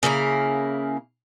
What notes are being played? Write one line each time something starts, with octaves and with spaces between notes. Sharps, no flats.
C#3 A#3 E4 A#4